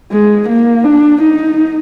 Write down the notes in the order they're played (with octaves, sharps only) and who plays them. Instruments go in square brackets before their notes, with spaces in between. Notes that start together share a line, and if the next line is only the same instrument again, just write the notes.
[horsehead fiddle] G#3
A#3
D4
D#4